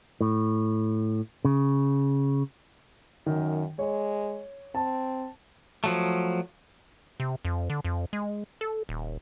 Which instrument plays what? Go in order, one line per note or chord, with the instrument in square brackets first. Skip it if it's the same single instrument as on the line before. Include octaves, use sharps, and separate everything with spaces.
[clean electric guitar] A2
C#3
[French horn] F#2 [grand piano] D#3
[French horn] G#3 [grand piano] C#5
[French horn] C4 [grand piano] A5
[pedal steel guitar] F3 F#3 A3
[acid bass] C3
F2
D3
F2
G#3
A4
D#1